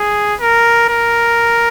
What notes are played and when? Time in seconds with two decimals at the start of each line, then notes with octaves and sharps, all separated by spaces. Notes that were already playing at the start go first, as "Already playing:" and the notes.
Already playing: G#4
0.40 A#4
0.89 A#4